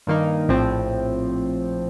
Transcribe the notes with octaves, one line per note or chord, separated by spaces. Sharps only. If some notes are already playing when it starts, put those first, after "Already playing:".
G2 D#3 A#3 D#4
A#1 A2 F3 C4